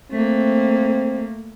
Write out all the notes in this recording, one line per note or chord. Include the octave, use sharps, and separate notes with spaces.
A3 A#3 C4